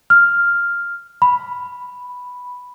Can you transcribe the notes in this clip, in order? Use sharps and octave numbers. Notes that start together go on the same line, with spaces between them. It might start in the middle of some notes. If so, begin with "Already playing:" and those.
F6
B5